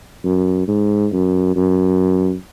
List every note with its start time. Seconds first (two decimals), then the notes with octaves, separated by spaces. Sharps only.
0.24 F#2
0.67 G#2
1.12 F#2
1.56 F#2